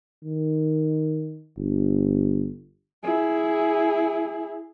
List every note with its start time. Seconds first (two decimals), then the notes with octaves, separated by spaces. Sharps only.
0.24 D#3
1.57 G1
3.03 E4 G#4